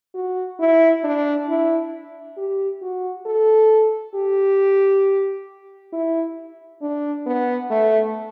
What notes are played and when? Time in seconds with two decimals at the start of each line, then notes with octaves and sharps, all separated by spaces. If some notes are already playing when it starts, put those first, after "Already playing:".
0.15 F#4
0.60 E4
1.04 D4
1.49 E4
2.38 G4
2.82 F#4
3.26 A4
4.15 G4
5.93 E4
6.82 D4
7.26 B3
7.71 A3